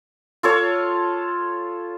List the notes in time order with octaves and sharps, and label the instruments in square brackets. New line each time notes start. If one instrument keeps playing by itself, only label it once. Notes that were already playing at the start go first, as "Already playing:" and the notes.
[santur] F4 A4 C#5